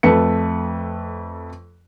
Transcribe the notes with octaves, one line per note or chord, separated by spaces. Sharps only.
F2 A3 B4 C#7